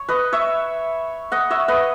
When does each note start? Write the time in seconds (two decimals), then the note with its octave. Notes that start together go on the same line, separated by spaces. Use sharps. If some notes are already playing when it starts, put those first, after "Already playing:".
Already playing: C#5
0.09 B4 D#5
0.33 C#5 E5
1.32 D#5 F#5
1.50 C#5 E5
1.68 B4 D#5